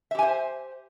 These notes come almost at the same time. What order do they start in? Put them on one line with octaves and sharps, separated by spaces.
E5 G4 G#5 C5